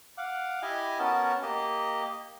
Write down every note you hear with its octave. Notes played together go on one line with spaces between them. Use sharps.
F5 F#5 D6
E4 G4 D#5 G#5
B3 C#4 F#4 A#4 A5
A#3 G4 D#5